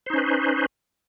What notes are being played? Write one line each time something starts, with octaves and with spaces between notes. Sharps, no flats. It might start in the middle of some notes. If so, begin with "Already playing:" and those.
C#4 D#4 B4 C5